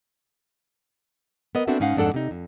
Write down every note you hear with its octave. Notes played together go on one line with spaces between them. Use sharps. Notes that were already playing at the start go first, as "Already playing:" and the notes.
B3 A#4 D#5
B3 C4 D4 F#4 A4 E5
G#2 C#4 D#4 F5 F#5
F2 G#2 D4 A4 F#5
C3 D#4
F2